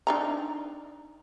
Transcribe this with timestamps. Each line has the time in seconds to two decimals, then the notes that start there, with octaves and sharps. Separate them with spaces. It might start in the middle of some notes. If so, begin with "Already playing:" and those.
0.07 D4 D#4 A#5